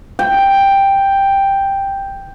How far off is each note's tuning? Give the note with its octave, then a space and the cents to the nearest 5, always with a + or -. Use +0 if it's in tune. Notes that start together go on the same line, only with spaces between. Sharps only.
G5 +5